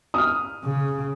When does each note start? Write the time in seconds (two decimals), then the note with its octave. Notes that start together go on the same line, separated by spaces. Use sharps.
0.14 D#6 F6
0.64 C#3